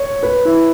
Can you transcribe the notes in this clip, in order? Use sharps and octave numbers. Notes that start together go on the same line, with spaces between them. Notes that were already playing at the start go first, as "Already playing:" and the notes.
Already playing: C#5
B4
E4